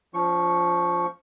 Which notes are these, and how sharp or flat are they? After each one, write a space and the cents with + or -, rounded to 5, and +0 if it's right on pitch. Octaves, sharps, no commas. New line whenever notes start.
F3 +0 C#4 +45 C#6 -5